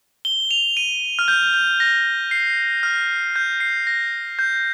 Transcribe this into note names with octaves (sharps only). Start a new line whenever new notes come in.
G7
F7
D#7
F6
G6
G6
A#6
C7
F6
G6
C7
A#6
G6